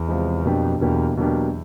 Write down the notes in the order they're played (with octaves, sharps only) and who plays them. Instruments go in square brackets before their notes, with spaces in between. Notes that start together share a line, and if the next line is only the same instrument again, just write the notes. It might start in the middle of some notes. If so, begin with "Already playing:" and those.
Already playing: [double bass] E2
[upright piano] C3 F3 G#3
[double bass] F2 [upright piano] B2 F#3 A#3 D4 G4
[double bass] E2 [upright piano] B2 F#3 A#3 D4 G4
[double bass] E2 [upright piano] B2 F#3 A#3 D4 G4